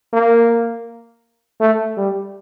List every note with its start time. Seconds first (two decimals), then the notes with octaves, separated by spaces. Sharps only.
0.13 A#3
1.60 A3
1.97 G3